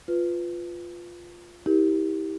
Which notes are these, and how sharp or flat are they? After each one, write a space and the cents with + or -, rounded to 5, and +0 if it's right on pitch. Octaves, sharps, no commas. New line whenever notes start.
F4 +0 B4 +10
E4 -40 G4 +0 A#4 +0